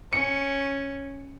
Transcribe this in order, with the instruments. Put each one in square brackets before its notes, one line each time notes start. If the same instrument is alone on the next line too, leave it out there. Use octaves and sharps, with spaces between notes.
[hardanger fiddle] C#4 [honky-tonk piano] C#7